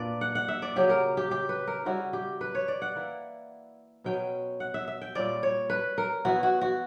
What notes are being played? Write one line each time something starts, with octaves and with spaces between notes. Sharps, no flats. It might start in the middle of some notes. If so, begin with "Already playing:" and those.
Already playing: A#2 A#3 D4 B4 D5
F#5
F#5
E5
D5
C#3 F#3 C#4 G4
A#4
G4
G4
B4
A#4
C#3 G3 C#4 E4 F#4
G4
B4
C#5
D5
F#5
E3 A#3 E4
B2 F#3 C#4 G5
F#5
E5
E5
G5
A#2 G3 C#4 D5
C#5
B4
A#4
E3 B3 E4 F#4
F#4
F#4